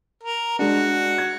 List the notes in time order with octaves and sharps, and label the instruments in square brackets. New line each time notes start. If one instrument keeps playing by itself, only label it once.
[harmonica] A#4
[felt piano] G#3 D4 [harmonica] F#4
[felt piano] G#6